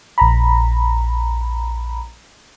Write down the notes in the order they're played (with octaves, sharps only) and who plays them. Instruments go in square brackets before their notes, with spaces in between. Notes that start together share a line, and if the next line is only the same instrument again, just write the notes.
[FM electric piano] A#1 A#5 B5